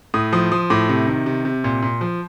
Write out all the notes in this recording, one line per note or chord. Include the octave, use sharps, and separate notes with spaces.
A2 D#6
F3 D#6
F3 D#6
A2 D6
C3
D#3
C3
C3
A#2
A#2
F3